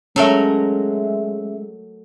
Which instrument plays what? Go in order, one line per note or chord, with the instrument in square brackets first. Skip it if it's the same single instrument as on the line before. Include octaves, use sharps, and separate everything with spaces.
[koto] F#3 A3 A#4 [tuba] G#3 [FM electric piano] C#4 E5